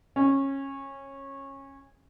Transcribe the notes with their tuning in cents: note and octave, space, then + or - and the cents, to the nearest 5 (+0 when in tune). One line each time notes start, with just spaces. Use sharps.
C#4 -20